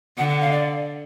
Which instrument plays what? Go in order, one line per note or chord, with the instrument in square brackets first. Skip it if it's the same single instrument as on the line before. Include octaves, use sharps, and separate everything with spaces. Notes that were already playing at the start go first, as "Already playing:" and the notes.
[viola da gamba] D3 [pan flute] F#5
[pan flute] F#5
F5
D5